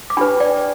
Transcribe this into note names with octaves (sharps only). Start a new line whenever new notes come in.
D6
D4 G4 B4 G5 B5
D5 G5